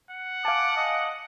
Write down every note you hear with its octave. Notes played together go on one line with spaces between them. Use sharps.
F#5
F5 G#5 A5 D6
D#5